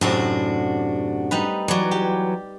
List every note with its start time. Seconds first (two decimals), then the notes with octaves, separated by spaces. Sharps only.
0.01 F#2 A2 C3 D4 F#4
1.31 G3 D#4 B4
1.68 E3 F#3 D5
1.91 G4